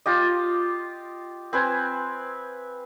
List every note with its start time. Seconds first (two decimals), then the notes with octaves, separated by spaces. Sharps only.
0.06 F4 G4 D#5
1.53 C4 B4 G#5